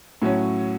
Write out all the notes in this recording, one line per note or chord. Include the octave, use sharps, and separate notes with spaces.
A2 F#3 C#4